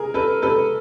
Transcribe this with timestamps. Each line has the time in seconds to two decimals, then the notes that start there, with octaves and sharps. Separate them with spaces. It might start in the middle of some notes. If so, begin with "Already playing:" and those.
Already playing: G#4 A#4
0.14 A4 B4
0.42 A4 B4